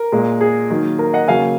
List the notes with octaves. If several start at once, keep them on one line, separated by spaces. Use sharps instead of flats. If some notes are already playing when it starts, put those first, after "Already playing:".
Already playing: A#4
A#2 G#3
G#4
D#3 F#3 A#3
A#4
D#5 F#5
C#3 F#3 A#3 F5 G#5